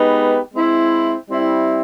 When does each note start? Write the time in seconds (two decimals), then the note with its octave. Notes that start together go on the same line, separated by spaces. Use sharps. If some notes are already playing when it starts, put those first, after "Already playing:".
Already playing: G#3 B3 D#4 G4 B4
0.54 G#3 C4 E4
1.30 G3 C4 E4